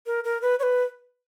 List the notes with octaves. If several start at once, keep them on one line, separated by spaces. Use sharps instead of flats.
A#4
A#4
B4
C#5
B4